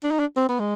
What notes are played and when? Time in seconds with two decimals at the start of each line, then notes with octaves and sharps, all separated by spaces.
0.04 D4
0.11 D#4
0.19 D4
0.36 C4
0.49 B3
0.60 G#3